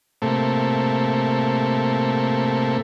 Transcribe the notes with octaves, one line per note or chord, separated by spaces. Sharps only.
A2 C3 A3 A#3